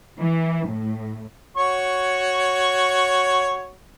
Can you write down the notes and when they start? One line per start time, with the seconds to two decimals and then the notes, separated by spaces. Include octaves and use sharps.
0.19 E3
0.67 A2
1.57 F#4 C#5 C#6